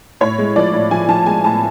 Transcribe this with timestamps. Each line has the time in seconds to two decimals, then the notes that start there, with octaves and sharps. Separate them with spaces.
0.21 A2 C#5
0.38 G#3
0.56 F3 D5
0.73 A2
0.91 F3 G#5
1.09 F3 A5
1.26 G#3 G#5
1.44 A2 A5